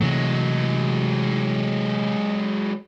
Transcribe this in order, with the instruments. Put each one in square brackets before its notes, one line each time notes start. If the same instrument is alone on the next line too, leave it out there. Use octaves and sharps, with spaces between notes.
[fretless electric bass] C3 E3 A3 [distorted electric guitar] F#3 G#3